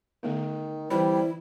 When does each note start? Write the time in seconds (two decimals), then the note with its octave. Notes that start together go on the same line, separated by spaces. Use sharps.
0.23 D3 D#3 A3 B3
0.90 E3 G3 C4 E4 B5